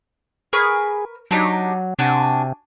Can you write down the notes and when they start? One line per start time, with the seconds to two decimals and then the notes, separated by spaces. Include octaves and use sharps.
0.53 G#4 A#4 B4 C#6
1.31 F#3 D4 D#4 G4
1.99 C3 D4 F#4 G#5